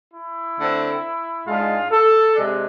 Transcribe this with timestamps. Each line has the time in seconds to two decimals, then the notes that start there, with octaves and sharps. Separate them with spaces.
0.14 E4
0.57 D3 A3 C4
1.47 G#2 G#3 D4 F4
1.91 A4
2.35 C3 G#3 D4